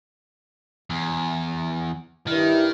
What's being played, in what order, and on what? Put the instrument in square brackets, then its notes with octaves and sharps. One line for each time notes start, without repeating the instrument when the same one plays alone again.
[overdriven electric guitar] E2
[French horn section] G2 E4 [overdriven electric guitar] D#3